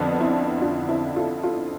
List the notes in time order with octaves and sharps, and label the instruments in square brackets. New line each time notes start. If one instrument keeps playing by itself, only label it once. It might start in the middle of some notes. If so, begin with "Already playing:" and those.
Already playing: [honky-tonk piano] F2 D3 F3 B3 D4
C4 E4
D4 F4
C4 E4
F4 A4
F4 A4